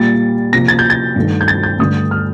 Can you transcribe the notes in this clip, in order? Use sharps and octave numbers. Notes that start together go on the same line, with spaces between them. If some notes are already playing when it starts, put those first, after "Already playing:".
Already playing: A#2 G3 A#3 A6
C3 F3 A#3 A#6
A6
G6
A6
G2 D#3 A3
G6
A6
G6
G2 D3 A3 D#6
F6